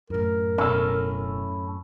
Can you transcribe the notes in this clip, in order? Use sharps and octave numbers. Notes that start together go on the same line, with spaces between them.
A1 F#2 A2 F4 A#4
E1 C#4 E4 A4